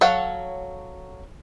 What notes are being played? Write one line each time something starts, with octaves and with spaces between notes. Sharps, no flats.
F#3 A4 C#5 F5 F#5